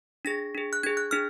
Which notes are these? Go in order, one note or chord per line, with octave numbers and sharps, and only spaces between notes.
D4 G#4 A#6
D4 G#4
F#6
D4 G#4 G#6
F#6
D4 G#4 F6